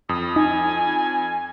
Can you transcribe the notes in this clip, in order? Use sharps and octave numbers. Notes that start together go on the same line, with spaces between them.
F2 D#6
D#4 G#5